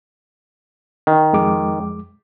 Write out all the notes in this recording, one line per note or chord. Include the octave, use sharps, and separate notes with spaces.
D#3
F2 G#3 D6